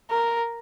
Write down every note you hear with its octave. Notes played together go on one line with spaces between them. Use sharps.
A#4